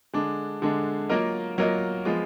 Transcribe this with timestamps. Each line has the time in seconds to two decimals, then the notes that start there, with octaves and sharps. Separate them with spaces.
0.13 D3 G#3 D4
0.62 D3 G#3 D4
1.09 F#3 A#3 F4 A#4 D#5
1.58 F#3 A#3 F4 A#4 D#5
2.05 F3 G#3 B3 F4